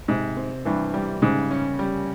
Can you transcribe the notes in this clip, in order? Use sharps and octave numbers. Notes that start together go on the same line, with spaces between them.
G#2 C3
C4
G2 E3
G3
G#2 C#3
C#4
G3